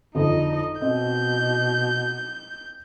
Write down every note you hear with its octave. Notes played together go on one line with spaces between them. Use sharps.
G1 F2 D3 D#4 D#5
B2 C4 D#5 G6